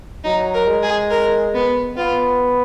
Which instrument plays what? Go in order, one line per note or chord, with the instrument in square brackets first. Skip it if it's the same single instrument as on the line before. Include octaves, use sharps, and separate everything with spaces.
[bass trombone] F#3 [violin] D#4
[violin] A#4
[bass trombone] G#3
[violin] G#4
A#4
B3
[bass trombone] B3 [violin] F4